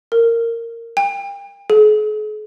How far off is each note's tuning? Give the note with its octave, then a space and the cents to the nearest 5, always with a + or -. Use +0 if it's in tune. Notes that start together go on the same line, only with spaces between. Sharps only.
A#4 -15
G5 +35
G#4 +45